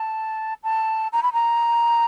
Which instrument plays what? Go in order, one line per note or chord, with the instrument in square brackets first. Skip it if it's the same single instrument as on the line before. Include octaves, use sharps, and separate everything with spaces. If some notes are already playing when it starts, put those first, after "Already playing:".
Already playing: [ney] A5
A5
A#5
B5
A#5